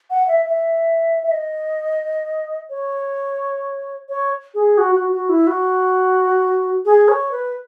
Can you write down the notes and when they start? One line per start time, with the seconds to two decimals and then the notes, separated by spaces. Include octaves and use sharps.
0.10 F#5
0.28 E5
0.45 E5
1.23 E5
1.31 D#5
2.70 C#5
4.09 C#5
4.54 G#4
4.78 F#4
4.95 F#4
5.12 F#4
5.29 E4
5.47 F#4
6.85 G#4
7.08 C#5
7.32 B4